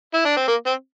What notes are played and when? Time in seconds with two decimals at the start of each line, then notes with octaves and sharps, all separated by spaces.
0.14 E4
0.25 D4
0.37 C4
0.48 A#3
0.66 C4